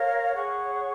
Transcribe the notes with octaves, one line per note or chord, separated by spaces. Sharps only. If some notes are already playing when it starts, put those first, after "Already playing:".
Already playing: A#4 C#5 F5
G#4 C#5 F#5 C#6